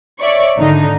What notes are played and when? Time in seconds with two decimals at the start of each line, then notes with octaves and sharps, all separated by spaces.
0.20 C#5 D5 E5 C#6
0.58 G#1 D3 D#4